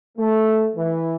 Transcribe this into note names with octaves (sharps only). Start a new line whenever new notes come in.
A3
E3